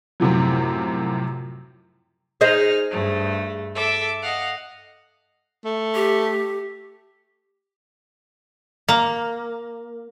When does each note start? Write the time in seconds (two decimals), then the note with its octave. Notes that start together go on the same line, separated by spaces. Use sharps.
0.20 F#2 A2 C3 F3 F#3
2.41 D#4 G#4 C5 D#5 F6
2.90 G2 A3
3.73 A4 E5 D6
4.22 D#5 F5 F#5
5.65 A3
5.95 G4
8.88 A#3